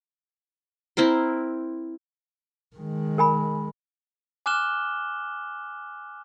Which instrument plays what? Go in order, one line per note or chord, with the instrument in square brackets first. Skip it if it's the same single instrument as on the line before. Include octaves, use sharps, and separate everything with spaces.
[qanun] C4 E4 A#4 C6
[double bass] D#3 G#3
[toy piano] A#4 G#5 B5
[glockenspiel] G#5 D6 F6 F#6 E7 G7